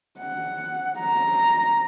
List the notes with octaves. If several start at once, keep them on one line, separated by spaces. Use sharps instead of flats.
F#5
A#5